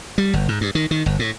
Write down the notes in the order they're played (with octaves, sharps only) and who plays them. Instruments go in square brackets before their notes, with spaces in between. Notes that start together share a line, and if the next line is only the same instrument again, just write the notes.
[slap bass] G3
G1
G#2
G2
D#3
D#3
G1
A2